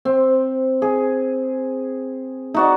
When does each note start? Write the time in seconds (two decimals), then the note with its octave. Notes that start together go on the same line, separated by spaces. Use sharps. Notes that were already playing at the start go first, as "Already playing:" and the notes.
0.05 C4
0.82 G#4
2.54 D#4 F#4 D5